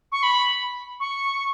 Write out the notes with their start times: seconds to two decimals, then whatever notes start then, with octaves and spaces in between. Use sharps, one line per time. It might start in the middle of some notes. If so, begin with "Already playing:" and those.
0.12 C#6
0.23 B5
1.00 C#6